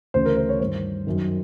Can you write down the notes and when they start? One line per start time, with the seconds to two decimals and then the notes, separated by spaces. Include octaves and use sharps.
0.14 D2 C#3 E3 C5
0.25 A#4
0.37 C5
0.49 C#5
0.60 G2 D#3 C5
1.07 F#2 D#3